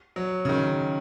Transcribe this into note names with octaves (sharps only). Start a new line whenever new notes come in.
F#3
C#3
D#3